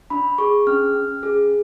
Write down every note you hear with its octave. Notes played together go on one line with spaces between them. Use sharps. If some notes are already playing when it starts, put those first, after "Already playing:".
D4 B5
G#4 C#6
C#4 F6
C#4
G#4